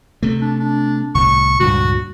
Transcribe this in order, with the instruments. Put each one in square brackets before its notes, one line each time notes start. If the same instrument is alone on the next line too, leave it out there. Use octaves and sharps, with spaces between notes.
[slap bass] C3 A3
[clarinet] D4
D4
[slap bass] C2 A2 [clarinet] C#6
[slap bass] C#2 G2 A#2 [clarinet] F#4